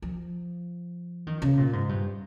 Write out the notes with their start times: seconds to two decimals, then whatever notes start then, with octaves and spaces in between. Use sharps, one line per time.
0.02 F3
1.27 D#3
1.42 C#3
1.57 A#2
1.73 G#2
1.89 G2